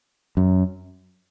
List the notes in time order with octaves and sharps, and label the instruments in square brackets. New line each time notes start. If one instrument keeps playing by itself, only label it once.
[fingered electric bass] F#2